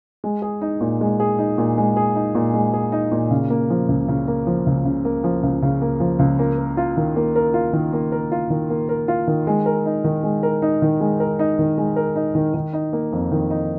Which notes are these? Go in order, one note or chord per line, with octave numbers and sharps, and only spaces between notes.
G#3
G#4
D#4
A#2
G#3
G#4
D#4
A#2
G#3
G#4
D#4
A#2
G#3
G#4
D#4
A#2
C#3
A#3
F3
C#2
C#3
A#3
F3
C#2
C#3
A#3
F3
C#2
C#3
A#3
F3
C#2
A#3
A#4
F4
D#3
A#3
A#4
F4
D#3
A#3
A#4
F4
D#3
A#3
A#4
F4
D#3
G#3
A#4
D#4
D#3
G#3
A#4
D#4
D#3
G#3
A#4
D#4
D#3
G#3
A#4
D#4
D#3
D#3
D#4
A#3
F2
D#3
D#4